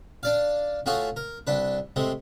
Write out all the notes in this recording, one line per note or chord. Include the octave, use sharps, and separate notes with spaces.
D4 D5 F5
A3 F4 F#4 G#4 C#5 G#5
A#4
C2 D4 B4
C3 G#3 A3